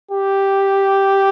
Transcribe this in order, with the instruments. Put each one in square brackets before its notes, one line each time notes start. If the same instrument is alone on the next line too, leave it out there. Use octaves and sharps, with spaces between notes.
[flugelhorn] G4